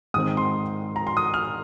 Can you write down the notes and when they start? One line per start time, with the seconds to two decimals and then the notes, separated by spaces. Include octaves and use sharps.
0.14 G#2 D#3 C4 D#6
0.37 C6
0.96 A#5
1.07 C6
1.17 D#6
1.34 F6